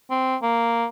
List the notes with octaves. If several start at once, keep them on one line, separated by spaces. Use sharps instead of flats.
C4
A#3